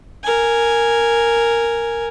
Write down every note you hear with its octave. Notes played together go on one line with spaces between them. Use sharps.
A#4 G#5